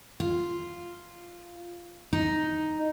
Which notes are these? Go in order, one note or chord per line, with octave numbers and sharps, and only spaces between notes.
F4
D#4